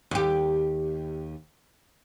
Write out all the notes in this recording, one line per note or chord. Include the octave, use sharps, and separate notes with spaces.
D#2 G4